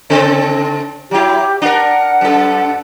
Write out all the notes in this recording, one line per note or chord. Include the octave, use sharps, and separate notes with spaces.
C#3 C4 A4
F#3 E4 G4
D4 A#4 F#5
F#2 A4